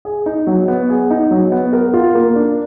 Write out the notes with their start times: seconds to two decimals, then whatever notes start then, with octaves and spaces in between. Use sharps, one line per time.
0.05 G#4
0.26 D#4
0.47 F#3
0.68 B3
0.89 G#4
1.10 D#4
1.31 F#3
1.52 B3
1.73 A#4
1.94 F4
2.15 A#3
2.35 D4